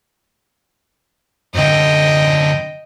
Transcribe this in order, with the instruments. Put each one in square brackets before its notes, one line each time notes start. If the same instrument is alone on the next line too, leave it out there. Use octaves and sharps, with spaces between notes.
[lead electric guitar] F#2 D3 [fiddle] D#5 G5